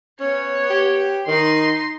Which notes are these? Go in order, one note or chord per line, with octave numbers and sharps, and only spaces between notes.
B3 C#4 C#5
G4
D#3 D#4 C6